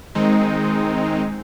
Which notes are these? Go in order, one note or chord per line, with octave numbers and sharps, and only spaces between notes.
D#3 G#3 C4 D#4